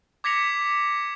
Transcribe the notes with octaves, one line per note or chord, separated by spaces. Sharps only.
D6 G#6 A#6 B6 C#7 F7